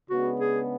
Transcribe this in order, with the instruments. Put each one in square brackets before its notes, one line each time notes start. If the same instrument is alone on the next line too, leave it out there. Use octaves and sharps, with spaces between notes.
[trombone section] C#3 G#3 B3 D4 [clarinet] F#4
[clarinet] G#4